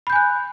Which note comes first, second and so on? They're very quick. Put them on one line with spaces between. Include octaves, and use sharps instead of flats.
B5 G6 G#5 F#6